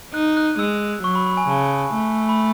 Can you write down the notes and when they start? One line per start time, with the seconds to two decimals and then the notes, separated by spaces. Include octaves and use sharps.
0.13 D#4 F#6
0.37 F#6
0.59 G#3 E6
1.03 F#3 C#6
1.15 B5
1.26 B5
1.37 G#5
1.49 C#3 A5
1.94 A3
2.29 B5